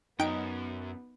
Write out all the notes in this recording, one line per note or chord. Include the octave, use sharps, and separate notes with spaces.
F#2 B3 D#4 G5 D7